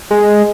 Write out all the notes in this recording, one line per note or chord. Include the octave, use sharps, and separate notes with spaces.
G#3